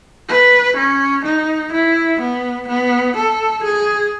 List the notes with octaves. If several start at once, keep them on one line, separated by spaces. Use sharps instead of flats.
B4
C#4
D#4
E4
B3
B3
A4
G#4